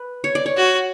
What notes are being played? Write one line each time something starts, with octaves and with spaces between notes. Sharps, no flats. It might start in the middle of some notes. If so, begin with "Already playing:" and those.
Already playing: B4
C#5
D5
C#5
F#4